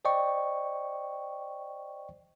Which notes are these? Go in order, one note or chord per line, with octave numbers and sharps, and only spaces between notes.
C5 D5 D#5 G5 C#6